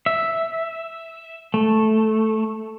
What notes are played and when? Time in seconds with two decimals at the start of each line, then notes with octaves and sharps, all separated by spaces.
0.06 E5
1.54 A3